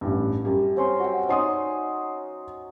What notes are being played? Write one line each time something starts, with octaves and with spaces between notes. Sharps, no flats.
A1 G2
F#2 G3
C4 C#4 C6
F#4 E5 G5
F#3 C#4 D#4 D5 C6 D#6